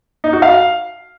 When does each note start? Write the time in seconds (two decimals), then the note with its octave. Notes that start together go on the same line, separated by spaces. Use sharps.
0.24 D#4
0.33 F#4
0.42 F5